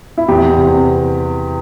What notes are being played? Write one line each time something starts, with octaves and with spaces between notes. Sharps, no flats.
E4
E2 G4
C3